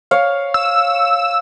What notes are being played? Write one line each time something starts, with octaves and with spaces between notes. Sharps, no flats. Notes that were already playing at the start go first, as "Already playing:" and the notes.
C#5 F5
E6